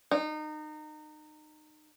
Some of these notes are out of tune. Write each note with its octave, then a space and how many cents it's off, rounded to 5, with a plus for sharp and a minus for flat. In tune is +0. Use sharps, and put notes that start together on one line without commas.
D#4 -25